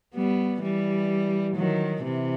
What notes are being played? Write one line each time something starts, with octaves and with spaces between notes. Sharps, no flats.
G3 B3
E3 G3
D#3 F#3
C3 E3